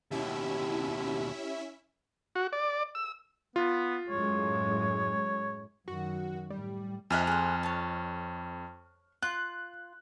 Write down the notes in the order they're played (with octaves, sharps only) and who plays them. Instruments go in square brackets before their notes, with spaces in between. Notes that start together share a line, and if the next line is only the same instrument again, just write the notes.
[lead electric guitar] D#2 B2 [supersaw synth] C#4 E4 E5 [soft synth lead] G4
[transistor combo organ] F#4
D5
E6
[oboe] B3 [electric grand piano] F4
[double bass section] F#2 A2 G#3 [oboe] C#5
[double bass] F#2 D#3 [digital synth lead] F#4
[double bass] A2 [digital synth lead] G3
[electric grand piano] F2 F6 F#6 [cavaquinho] G#4 D#5 E5
[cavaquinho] G#4 C5
C#5 A5
[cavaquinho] F4 [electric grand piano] F#6